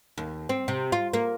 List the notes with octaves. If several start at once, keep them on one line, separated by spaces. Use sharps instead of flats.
D#2
C4
C3
F4
A#3